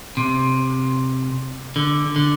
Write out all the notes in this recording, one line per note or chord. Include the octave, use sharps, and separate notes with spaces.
C3
D3
D3